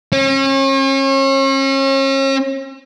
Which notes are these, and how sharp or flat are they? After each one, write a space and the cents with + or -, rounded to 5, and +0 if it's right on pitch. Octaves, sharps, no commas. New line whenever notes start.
C#4 -40